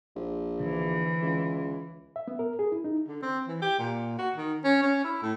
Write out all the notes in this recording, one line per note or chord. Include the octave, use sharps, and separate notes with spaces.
A#1
D3 E3
C#2
E5
B3
A#4
G#4
E4
D#4
D3
C4
E3
G4
A#2
F#4
D#3
C#4
C#4
E4
A2